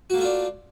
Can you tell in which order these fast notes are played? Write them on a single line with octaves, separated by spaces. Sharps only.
F#4 A#3 A3 F4 D4